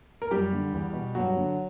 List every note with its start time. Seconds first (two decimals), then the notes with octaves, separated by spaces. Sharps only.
0.22 A#4
0.31 F#2 G3 G4
0.52 D3
0.73 E2
0.93 B2
1.15 G2 F#3 F#4
1.37 D3